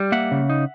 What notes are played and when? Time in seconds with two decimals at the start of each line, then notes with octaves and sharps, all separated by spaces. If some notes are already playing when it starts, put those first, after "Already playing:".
Already playing: G3
0.12 A#3 E5 F#5
0.31 C#3
0.50 D#4